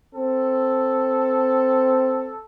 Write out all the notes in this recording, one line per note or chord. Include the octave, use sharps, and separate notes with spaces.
C4 A4